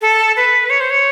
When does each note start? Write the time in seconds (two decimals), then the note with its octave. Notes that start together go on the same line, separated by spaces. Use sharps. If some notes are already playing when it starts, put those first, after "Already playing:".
0.02 A4
0.36 B4
0.70 C#5
0.80 C5
0.90 C#5